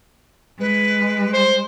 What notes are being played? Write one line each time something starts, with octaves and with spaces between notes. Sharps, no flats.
G#3 B4
C5